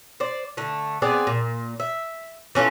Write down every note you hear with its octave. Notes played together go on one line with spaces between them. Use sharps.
C5 D5
D3 A3
B3 C4 G#4 D5
A#2
E5
E3 C#4 F4 A4